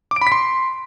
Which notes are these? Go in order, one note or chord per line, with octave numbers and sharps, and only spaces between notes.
D6
D7
B5
B6
C6